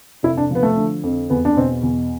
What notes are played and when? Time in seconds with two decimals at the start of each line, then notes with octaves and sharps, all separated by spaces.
0.23 F1 E4
0.37 D4
0.51 F3 B3
0.63 A3
0.77 D3
1.04 F2
1.30 E2 B3
1.45 D4
1.56 B2 C4
1.83 E2